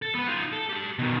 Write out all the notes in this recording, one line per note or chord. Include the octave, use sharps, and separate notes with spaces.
A4
B3 B4
D#4 F4
A4
G4 A5
B2 D#3